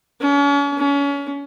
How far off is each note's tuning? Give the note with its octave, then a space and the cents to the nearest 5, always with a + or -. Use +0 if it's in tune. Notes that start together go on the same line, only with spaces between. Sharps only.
C#4 +40
C#4 +30